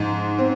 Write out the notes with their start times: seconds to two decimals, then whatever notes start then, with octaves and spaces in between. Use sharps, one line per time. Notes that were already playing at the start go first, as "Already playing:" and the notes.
Already playing: G#2 F3
0.38 C4